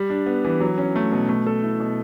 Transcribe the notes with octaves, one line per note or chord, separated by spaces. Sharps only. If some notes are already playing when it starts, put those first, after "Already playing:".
Already playing: G3
D4
B3
E3
F#3
C#4
A3
B2
A3
A4
E4
B2